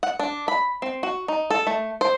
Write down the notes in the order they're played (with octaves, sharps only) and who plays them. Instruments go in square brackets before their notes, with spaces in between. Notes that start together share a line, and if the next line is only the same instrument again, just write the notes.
[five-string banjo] F#5
D4
B5
C4
F#4
D#4
A4
A3
C5